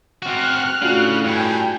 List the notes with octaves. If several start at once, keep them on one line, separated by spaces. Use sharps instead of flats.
C4 F#4 F6 F#6
A2 C#3 D4 F4 F#4
G2 G5 G#5